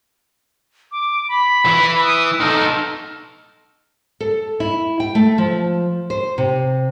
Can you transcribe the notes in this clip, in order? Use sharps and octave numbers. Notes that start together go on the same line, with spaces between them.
D6
B5
E3
D#6
D#4 A4 F6
A4
E4
G5
A3
F3
C5
C3